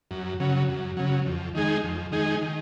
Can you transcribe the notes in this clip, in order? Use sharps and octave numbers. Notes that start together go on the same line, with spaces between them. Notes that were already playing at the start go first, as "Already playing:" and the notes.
F#2
C#3 F#3
F#2
C#3 F#3
F2
D#3 G#3 D#4 G#4
F2
D#3 G#3 D#4 G#4
D#3